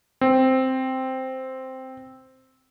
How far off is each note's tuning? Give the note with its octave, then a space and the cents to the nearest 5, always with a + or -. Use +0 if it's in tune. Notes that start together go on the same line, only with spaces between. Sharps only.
C4 +0